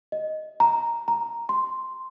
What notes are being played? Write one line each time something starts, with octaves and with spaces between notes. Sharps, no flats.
D#5
A#5
A#5
C6